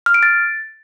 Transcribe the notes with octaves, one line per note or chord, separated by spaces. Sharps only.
F6
D7
A6